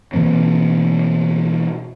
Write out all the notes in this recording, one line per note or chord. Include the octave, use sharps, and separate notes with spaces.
B2 E3 A#3 C4